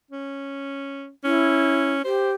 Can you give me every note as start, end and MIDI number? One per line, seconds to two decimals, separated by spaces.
0.11 1.09 61
1.24 2.03 61
1.24 1.92 64
2.04 2.35 67
2.04 2.31 72